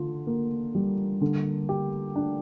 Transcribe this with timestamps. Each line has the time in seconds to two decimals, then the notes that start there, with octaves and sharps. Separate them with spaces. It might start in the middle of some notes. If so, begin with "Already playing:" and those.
Already playing: D3 F4
0.27 A#3
0.75 G3
1.21 D3
1.69 G4
2.16 D4